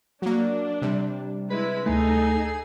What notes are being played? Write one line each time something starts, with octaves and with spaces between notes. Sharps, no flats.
F#3 A#3 D4
C3 G3
G#3 E4 B4
D2 A3 D#4 G#4 A4